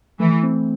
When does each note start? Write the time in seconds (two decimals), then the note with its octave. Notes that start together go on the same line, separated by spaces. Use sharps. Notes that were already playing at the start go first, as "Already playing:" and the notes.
0.20 E3 A3
0.43 C4